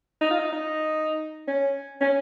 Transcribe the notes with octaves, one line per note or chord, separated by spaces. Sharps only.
D#4
F4
D#4
D#4
C#4
C#4